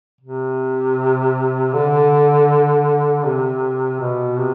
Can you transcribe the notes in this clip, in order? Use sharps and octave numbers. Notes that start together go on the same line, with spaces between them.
C3
D3
C3
B2
C3